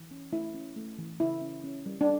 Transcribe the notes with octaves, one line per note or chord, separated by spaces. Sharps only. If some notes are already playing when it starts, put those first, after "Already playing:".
Already playing: E3
C#4
A3 E4
C#4
A3
E3
C#3 E4
C#4
C#4
G3
D4